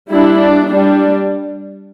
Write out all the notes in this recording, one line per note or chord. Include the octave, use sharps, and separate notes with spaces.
G3 D4 E4
D4
G3 D4